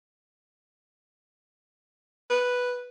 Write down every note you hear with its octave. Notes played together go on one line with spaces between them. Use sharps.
B4